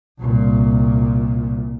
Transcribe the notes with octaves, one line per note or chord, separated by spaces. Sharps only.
C2 A#2